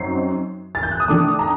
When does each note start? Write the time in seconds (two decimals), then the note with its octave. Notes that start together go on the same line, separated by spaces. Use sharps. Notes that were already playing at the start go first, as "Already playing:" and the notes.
Already playing: F#2 F#3 C4 D#4 C7
0.75 A6
0.83 G6
0.91 F#6
1.00 D#6
1.08 D#3 A3 D4 D6
1.39 A#5